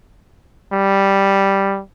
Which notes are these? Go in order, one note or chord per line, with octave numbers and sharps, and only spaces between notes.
G3